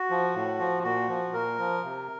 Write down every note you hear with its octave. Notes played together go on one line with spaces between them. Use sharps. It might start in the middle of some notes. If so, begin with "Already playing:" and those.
Already playing: F#4
F3
A2
F3
A#2 F#4
F3
A#2 A#4
F3
C3